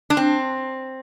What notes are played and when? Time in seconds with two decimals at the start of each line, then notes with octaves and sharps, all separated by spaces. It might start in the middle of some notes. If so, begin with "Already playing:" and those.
0.10 D4
0.17 C4